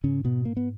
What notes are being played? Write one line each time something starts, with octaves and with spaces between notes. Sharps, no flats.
G#2 C#3 C#4
B2 B3
A#3
B3